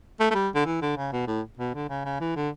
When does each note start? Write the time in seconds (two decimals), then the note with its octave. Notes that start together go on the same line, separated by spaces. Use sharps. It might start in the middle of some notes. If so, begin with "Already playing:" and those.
0.20 A3
0.31 A3
0.34 G3
0.55 D3
0.65 E3
0.82 D3
0.97 C#3
1.12 B2
1.27 A2
1.58 B2
1.74 D3
1.89 C#3
2.05 C#3
2.20 E3
2.36 D3